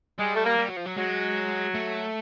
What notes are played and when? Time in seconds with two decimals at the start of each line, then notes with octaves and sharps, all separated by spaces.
0.19 G3 G#3
0.35 A3
0.45 A#3
0.58 G3
0.68 F#3
0.77 F3
0.86 F#3
0.96 F#3 G#3
1.74 A3